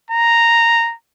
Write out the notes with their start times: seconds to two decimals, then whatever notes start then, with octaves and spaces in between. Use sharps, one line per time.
0.10 A#5